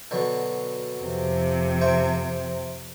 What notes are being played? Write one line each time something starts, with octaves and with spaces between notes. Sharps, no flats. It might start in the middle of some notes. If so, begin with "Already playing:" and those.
B2 D3 F#3
F2 C3
C5 E5 G5